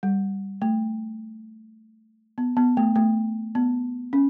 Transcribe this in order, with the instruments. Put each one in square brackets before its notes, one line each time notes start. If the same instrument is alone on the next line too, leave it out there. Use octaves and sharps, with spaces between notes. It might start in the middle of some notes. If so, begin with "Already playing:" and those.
[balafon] G3
A3
B3
B3
A3
A3
B3
C#4